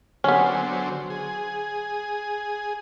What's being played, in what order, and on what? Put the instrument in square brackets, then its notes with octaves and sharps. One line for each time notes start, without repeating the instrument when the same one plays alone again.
[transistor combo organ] D3 F#3 C5 [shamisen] B3 C#4
[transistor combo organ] G#4